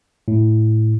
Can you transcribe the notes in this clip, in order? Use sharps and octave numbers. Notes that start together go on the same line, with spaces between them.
A2